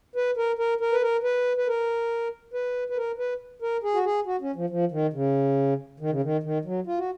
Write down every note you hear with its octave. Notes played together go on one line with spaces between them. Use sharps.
B4
A#4
A#4
A#4
B4
A#4
B4
B4
A#4
B4
B4
A#4
B4
A#4
G#4
F#4
G#4
F#4
C#4
F3
F3
D#3
C#3
D#3
C#3
D#3
D#3
F#3
F4
F#4